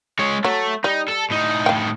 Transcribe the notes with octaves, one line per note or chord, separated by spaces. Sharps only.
G#3 C#5
F#3 A3
G3 D#4
A4
A2 D#4
F5 G5